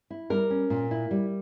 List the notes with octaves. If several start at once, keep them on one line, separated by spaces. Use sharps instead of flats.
E4
G3 A#4
C#4
A#2
E4
G3